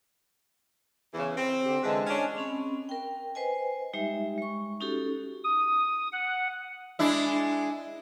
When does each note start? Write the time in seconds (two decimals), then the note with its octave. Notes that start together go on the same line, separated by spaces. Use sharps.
1.14 E2 C#3 E3
1.38 C4
1.63 D3 G4
1.84 D3 E3 G#3 G#4 A5
2.07 C#4 D4
2.37 C4 C#4 B5
2.89 A#4 G5
3.35 B4 C5 D#5 G#5
3.93 G3 G#3 D#4 G4 E5
4.38 G#3 C#6
4.80 C#4 D#4 F#4 G4 A4
5.44 D#6
6.12 F#5
6.99 G#3 D4 E4